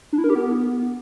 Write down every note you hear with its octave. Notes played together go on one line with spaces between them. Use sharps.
D4
E4
A#4
G4
B3